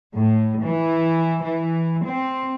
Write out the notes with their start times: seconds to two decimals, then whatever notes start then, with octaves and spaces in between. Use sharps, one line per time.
0.15 A2
0.63 E3
1.42 E3
2.04 C4